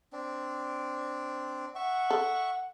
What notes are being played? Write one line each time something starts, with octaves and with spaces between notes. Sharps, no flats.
C4 D4
E5 F#5 C#6
A4